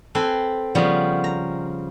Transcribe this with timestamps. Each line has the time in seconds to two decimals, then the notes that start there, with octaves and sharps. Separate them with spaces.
0.15 C4 A4 B4 G#5 C6
0.75 C#3 F3 G3 B3
1.24 A#5